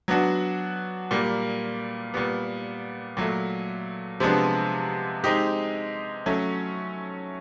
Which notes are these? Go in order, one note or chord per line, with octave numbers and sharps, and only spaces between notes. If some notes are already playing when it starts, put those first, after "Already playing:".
F#3 B3 D4 F#4
A#2 G3 A#3
A#2 G3 B3
A#2 F#3 A3
C3 F3 G#3 B3 D4
G#3 C4 D#4 G4
F#3 A3 C#4